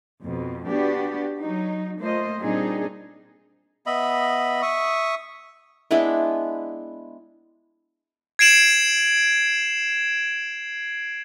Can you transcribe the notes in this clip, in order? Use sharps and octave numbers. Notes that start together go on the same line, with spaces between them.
F2 B2
B3 D4 F#4 G4
F#3 D#4
A3 A#3 F4 C5 D#5
A#2 G3 C4 D4 D#4 G#4
B3 D#5 E5 B5
E5 C#6 D#6
G#3 B3 D4 E4
G#6 C7 D7 E7 F#7